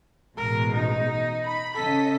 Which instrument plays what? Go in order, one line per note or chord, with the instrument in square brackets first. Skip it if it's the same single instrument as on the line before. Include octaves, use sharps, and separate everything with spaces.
[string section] A1 B2 G#3 [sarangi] A#4
[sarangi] D#4
[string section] B5
[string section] C#3 D#5 B6 [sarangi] A4